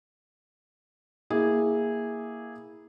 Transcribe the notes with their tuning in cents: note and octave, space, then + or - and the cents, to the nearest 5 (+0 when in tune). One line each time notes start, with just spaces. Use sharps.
A#3 +0 E4 -15 G#4 -10